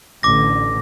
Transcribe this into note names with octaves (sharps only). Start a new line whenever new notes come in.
A1 D3 D6 A#6